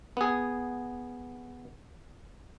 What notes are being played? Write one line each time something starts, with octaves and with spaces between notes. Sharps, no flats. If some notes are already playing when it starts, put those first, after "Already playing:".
B3 G#4